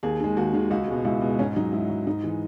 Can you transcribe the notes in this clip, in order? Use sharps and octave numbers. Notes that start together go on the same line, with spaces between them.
D#2 G#4
D#3 G#3
D#2 F#4
D#3 G#3
C#2 F#4
B2 G#3
C#2 E4
B2 G#3
G#2 C#4
F#3 D#4
G#2 E4
F#3
G#2 D#4
E3 G#3